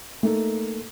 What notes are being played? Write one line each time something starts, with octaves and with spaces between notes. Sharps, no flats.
A3 A#3 D#4 A4